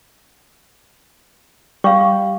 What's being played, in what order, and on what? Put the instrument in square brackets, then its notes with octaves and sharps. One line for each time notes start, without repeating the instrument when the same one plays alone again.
[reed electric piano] G3 G4 [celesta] F5 C#6